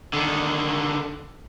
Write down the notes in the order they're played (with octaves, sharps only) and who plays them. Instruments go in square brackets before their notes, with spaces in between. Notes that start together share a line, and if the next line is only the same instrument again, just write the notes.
[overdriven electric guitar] D3 D#3